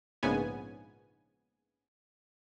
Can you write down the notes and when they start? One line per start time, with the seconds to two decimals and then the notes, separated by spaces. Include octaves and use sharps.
0.23 A#1 G#2 C#3 B3 G#5